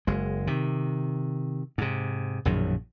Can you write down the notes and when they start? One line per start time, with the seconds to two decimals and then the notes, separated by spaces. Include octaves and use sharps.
0.07 F#1 G#3
0.47 C3 D#3
1.78 G#2 C3
2.45 A#1 F#2 B2 D#3